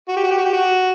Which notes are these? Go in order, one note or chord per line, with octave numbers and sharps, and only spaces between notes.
F#4
G4
F#4
G4
F#4
G4
F#4